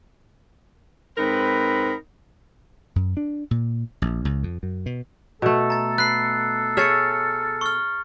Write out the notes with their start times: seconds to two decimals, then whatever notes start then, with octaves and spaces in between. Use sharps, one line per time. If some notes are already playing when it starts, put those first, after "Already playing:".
1.18 G#2 C4 D#4 A#4 B4 B5
2.96 F#2
3.17 D4
3.51 A#2
4.02 A#1
4.25 C#2
4.43 F2
4.63 F#2
4.86 B2
5.42 B2 A3 A4
5.70 A#5 A6
5.98 B4 F#6 C7
6.77 G#4 C#5 E5 F6 A6 C#7
7.61 C#6 F6